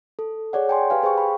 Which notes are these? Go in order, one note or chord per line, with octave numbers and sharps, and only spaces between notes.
A4
G#4 C#5 D5 F#5
G5 G#5 C6
G4 B4 F5 G#5
G#4 C5 F5 G5 C#6
B5